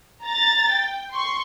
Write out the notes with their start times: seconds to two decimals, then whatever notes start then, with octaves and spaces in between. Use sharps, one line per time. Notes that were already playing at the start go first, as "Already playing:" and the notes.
0.23 A#5 A6
0.71 G5
1.12 C6 C#6